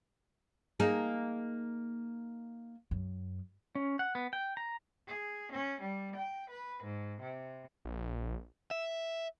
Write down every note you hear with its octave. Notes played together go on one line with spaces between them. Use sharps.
A#3 D#4 G#4
F#2
C#4
F#5
B3
G5
A#5
G#4
C#4
G3
G5
B4
G#2
C3
A#1
E5